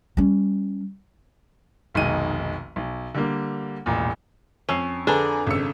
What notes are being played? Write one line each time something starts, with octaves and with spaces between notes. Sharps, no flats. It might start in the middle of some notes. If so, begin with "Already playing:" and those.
G3 C#4
F1 B1 D#3 G#3 D#7
B1
D3 G3 A#3
E1 A1 A#2
F2 C#4 E6 C7
D3 D4 G#4 B4 A#5
G#1 C#3 E6 C#7